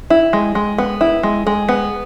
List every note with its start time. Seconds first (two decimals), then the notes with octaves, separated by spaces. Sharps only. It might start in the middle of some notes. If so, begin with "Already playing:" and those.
0.10 E4
0.33 G#3
0.55 G#3
0.78 B3
1.01 E4
1.23 G#3
1.47 G#3
1.69 B3